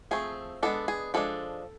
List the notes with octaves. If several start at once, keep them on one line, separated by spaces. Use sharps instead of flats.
F3 A3 C4 G#4
G#3 B3 D4 A4
G#4
F3 G#3 D4 A4